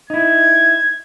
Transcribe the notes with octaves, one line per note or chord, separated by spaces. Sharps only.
D#4 E4 G#6